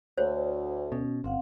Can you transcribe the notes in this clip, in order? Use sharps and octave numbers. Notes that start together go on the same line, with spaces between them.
D2 C5 C#5
B2 C#4
G1 C4 F5 F#5